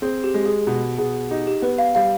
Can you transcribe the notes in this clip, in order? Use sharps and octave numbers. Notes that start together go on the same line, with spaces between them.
C4 G#4
G4
G#3 G4
G#4
B2 G#4
B2 G#4
D#4 G4
G4
B3 B4
F5
G3 F5